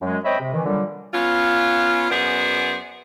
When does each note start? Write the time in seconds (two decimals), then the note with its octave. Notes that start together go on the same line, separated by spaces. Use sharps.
0.02 F#2 F#3 G#3
0.24 C4 C#5 D#5 E5 G5 B5
0.39 C3
0.53 D#3 E3
0.65 A#2 D3 F#3 G3
1.14 B3 C#4 F4
2.10 F#2 B3 G#4 C5 D5